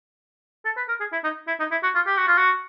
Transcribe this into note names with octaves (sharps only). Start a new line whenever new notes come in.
A4
B4
A#4
G#4
E4
D#4
E4
D#4
E4
F#4
F4
G4
F#4
F4
F#4